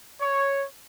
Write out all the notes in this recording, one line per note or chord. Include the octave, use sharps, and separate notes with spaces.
C#5